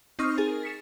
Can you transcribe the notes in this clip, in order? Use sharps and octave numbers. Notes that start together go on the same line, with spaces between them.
C4 D#4 C#6 D#6 F6
G#4 A#4 A6
B6 C#7 E7